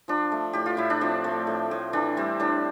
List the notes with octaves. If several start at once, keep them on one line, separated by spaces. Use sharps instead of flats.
F3 D4
A3
A2 G4
F4
A2 E4
D4
F3 C4
A3
A2
A2
E3 D4
G3 C4
A2 D4